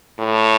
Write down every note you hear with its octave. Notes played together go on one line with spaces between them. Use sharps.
A2